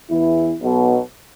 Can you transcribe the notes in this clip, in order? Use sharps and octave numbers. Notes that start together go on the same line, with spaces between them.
E2 E3 E4
B1 B2